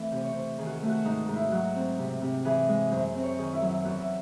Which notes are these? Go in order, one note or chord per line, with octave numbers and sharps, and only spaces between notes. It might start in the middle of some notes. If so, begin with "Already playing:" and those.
Already playing: E3 A3 C4
C3 C5
C#5
C3 C5
D#3 G#4
F#4
G#4
A3
F#4
G#2 D#4
G#2
E4
F#3 F#4
C4
C3
C3
E3 G#4
G#3
F#2 C5
C4
C#5
D#3 G#4
E4
F#3
E4
E2 F#4
E4